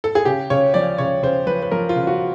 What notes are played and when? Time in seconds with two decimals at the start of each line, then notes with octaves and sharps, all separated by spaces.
0.04 A4
0.15 G#4
0.25 C#3 G4
0.50 C#3 C#5
0.74 F3 D5
0.98 C#3 C#5
1.23 C#3 C5
1.47 F3 B4
1.62 B4
1.71 F3 A#4
1.89 F4
1.96 C#3
2.07 F#4